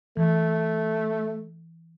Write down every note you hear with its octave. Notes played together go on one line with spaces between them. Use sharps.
E3 A3